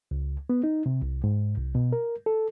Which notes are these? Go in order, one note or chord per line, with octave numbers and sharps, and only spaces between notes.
C#2
B3
D#4
C3
C2
G#2
C2
B2
A#4
A4